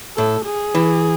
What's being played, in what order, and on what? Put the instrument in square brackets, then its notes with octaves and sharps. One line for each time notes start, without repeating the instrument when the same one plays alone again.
[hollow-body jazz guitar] A2 [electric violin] A4
[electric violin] G#4
[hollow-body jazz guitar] E3